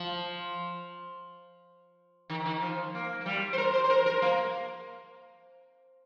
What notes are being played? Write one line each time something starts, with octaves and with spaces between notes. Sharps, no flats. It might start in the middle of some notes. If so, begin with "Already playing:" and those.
Already playing: F3
D#3
D#3
F3
A#3
A#3
G3
C5
A#4
C5
C5
A#4
A#4
A#3